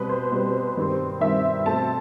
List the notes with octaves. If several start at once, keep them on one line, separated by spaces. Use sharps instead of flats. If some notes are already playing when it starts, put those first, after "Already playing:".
Already playing: B2 G3 C4 B4
C5
B2 G3 C4
G2 D#3 G3 C4
G2 D#3 G3 C4 E5
B2 A3 C4 A5